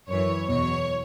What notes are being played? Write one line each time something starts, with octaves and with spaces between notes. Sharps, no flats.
F#2 E3 C#5
E2 B2 F#3 C#5